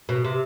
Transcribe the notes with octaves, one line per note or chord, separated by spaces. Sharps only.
B2
C3